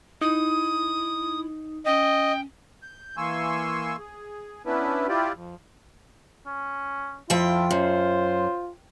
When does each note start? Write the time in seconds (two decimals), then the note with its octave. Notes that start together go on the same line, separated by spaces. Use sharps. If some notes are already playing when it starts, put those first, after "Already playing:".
0.21 D#4 E4 D#6
1.86 C#4 D#5 G5
2.83 G6
3.17 E3 A#3 G#5 C6 C#6 E6
3.98 G#4
4.66 B3 C#4 D4 E4 B4
5.08 E4 F4 G4 D5
5.35 F2
6.46 C#4
7.30 F2 F3 E4 F4 G5
7.71 F#2 C5